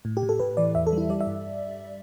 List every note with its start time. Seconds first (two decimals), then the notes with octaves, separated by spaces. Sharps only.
0.05 A2
0.17 G4
0.23 A2
0.29 A4
0.40 A2 B4
0.57 E3 D5
0.75 E2 E5
0.87 A4
0.93 G3
0.98 E4
1.09 G3 D5
1.21 E5
1.27 G2